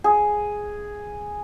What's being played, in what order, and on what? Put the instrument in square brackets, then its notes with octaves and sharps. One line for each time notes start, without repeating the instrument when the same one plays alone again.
[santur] G#4